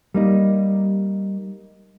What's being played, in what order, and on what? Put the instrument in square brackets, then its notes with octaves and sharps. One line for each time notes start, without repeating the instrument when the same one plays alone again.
[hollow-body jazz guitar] G3 A#3 D#4